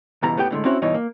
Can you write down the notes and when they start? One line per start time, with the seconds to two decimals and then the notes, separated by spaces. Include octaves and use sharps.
0.23 C#2 G2 B2 E3 A#5
0.37 A2 B3 G4 G5
0.50 A2 D3 G#3
0.65 C4 C#4 E4 F#4 C#5
0.82 G2 B2 E3 D#4 C#5
0.94 A#3